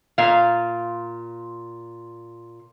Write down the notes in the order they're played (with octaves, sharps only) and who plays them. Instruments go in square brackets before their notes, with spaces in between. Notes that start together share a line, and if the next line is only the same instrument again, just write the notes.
[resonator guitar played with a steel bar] A#2 F5